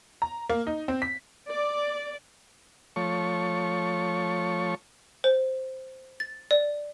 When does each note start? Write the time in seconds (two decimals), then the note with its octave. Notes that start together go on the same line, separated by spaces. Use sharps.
0.22 A#5
0.49 A#3
0.67 D#4
0.88 C4
1.02 B6
1.49 D5
2.96 F3 A3 C#5 C#6
5.24 C5
6.20 A6
6.51 D5